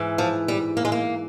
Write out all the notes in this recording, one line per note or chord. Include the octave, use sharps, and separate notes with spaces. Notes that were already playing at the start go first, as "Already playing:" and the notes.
Already playing: G#2 E3
F3
G3
A#3
G#3
A#3